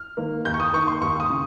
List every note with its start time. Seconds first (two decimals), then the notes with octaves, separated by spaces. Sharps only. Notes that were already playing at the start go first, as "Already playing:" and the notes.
Already playing: F6
0.17 D#3 A#3
0.45 D#2 G6
0.54 C#6
0.60 D#6
0.73 D#3 A#3 C#6
0.87 C6
1.01 D#2 C#6
1.20 D#6
1.30 C#3